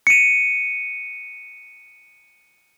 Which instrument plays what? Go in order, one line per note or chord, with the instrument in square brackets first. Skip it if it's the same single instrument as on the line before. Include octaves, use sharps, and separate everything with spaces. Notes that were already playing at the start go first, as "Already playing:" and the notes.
[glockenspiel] C#7 D#7